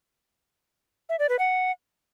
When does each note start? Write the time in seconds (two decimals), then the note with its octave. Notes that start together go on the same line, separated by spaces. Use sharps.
1.09 E5
1.19 D5
1.29 B4
1.39 F#5